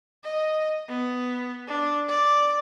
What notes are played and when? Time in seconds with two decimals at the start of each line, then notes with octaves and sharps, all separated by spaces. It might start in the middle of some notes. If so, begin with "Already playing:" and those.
0.24 D#5
0.89 B3
1.68 D4
2.09 D5